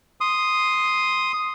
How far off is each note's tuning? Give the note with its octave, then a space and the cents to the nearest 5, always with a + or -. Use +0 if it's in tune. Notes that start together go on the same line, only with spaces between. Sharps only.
C6 +0 D#6 +0